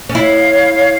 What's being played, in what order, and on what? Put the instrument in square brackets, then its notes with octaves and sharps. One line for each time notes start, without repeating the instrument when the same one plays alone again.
[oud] C#4
[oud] E4 [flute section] C#5 F5